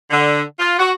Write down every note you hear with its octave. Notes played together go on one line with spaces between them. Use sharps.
D3
F4
F#4